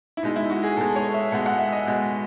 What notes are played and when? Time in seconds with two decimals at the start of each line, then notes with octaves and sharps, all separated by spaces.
0.17 E4
0.23 B2 G#3 D#4
0.36 E4
0.50 F#4
0.63 G#4
0.77 B2 G#3 A4
0.96 C#5
1.14 E5
1.32 B2 G#3 F#5
1.46 F#5
1.59 E5
1.72 D#5
1.86 B2 G#3